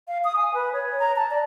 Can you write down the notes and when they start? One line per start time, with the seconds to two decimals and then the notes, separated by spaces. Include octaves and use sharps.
0.08 F5
0.24 D#6
0.36 G#5
0.54 B4
0.73 C#5
0.99 A#5
1.16 A5
1.31 D5